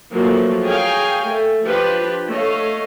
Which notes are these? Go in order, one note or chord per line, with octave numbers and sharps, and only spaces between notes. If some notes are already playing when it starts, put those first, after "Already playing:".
F3 F#3 A3 A#3
G#4 A#4 C#5 F5 G5 G#5
A3
F3 D4 F4 G4 B4
A3 C#5 D#5 F5